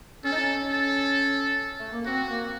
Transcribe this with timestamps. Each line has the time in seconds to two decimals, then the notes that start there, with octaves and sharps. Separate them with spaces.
0.24 C#4 A4
0.32 D#4
0.40 C#4
0.70 A4
1.78 A3
1.92 A#3
2.06 C4 F#4
2.29 A#3